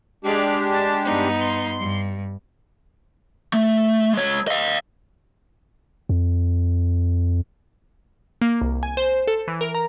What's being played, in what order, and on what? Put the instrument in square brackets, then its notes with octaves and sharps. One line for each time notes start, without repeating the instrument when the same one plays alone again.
[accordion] G#3 D4 G4 [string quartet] G#4 D5 F5
[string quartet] A5
G2 B3 D#4
[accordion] C6
[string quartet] G2
[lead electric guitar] A3
G#3 C#5
D#5 F5
[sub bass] F2
[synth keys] A#3
C2
G#5
C5
A4
E3
A#4
A#5